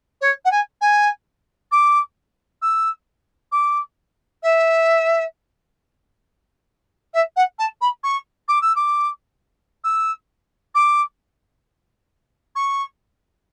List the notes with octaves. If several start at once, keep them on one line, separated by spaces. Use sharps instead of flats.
C#5
F#5
G#5
G#5
D6
E6
D6
E5
E5
F#5
A5
B5
C#6
D6
E6
D6
E6
D6
C#6